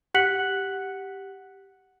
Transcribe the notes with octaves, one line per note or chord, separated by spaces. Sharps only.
G4 F#5 F#6 B6 C#7 F#7